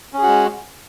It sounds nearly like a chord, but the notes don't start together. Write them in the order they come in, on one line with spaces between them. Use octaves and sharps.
C#4 G#4 F#4 G#3